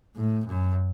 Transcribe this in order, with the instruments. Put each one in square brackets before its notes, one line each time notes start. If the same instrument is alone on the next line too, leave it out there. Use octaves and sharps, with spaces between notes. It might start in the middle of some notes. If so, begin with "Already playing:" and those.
[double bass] A2
F#2